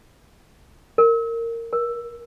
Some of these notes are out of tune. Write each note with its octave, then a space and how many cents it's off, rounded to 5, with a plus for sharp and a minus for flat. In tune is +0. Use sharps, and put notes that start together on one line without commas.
A#4 -20
A#4 +30